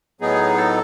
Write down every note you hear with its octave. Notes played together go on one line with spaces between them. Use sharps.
A2 F#3 B3 D#4 G#4
A4